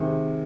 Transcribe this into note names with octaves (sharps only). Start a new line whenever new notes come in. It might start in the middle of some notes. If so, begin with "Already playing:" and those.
Already playing: C3 D#3 G#3